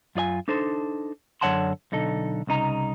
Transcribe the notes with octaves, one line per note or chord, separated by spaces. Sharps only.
F#2 F4 D5 G#5
D4 D#4 A4 C5
F#2 D3 C#5 F#5 A5 C6
B1 D3 D#4 A4
C2 C#3 D#4 A#5